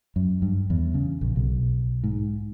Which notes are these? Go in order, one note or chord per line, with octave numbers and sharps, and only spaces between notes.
F#2
G2
E2
C#3
A#1
B1
G#2